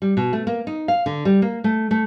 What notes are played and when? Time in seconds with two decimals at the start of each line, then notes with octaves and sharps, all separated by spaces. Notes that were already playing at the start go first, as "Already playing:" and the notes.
0.02 G3
0.17 B2
0.33 A3
0.47 A#3
0.67 D#4
0.88 F5
1.06 D3
1.25 G3
1.42 A#3
1.64 A3
1.91 A3